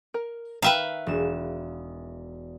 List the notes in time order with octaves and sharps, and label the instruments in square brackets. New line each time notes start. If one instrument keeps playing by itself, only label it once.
[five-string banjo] A#4
[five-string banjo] D#3 G5 A#5 [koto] B4 E5 F5
[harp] E1 E7